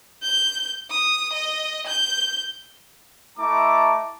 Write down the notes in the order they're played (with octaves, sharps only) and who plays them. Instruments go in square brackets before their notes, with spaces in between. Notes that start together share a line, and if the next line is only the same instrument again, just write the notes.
[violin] G6
D#6
D#5
G6
[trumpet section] A3 E4 D#5 A5 A#5 D6